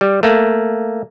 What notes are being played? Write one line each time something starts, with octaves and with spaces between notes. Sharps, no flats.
G3
A3 A#3